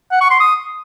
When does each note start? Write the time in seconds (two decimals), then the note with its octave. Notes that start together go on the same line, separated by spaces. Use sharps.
0.11 F#5
0.21 C#6
0.30 C6
0.40 D#6